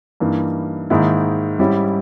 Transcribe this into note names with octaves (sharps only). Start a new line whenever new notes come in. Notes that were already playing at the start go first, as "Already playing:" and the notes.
G2 E3 A#3 D#4
G#2 D#3 A#3 E4 G#4
G#2 G3 C#4 E4 G4